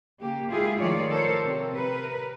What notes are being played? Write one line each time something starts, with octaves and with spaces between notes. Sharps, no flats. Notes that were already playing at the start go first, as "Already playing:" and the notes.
C#3 A#3 G4
G#3 E4 F4 G4 G#4
D#3 F3 A3 F4 C#5 D5
A4 A#4 C5 C#5
C3
A#4 B4